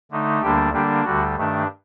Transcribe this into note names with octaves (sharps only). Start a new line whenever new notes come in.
D3 A3 D#4
D2 D3 G3 A#3 D4 G4
D3 G3 A#3 D4 G4
D2 D3 G3 F#4
G2 D#3 A3 D4